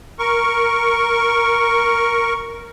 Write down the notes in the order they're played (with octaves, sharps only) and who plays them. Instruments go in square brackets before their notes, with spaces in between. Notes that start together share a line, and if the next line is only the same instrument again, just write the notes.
[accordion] A#4 C#6